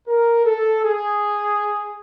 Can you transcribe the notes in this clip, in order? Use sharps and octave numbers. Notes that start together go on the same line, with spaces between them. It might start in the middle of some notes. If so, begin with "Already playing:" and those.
A#4
A4
G#4